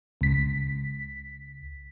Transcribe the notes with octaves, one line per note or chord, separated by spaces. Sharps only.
C#2 B6